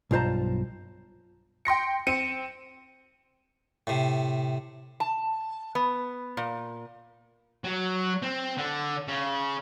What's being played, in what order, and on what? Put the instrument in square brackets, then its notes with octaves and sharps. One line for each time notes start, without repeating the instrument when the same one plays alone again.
[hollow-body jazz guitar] B1 G2 F4 C5 A5 A#5
[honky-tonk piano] G5 C6 A#6 C#7
C4 C#7 D#7
[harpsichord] A2 C3
[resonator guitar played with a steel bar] A5
B3
A#2
[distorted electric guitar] F#3
C4
D3
C#3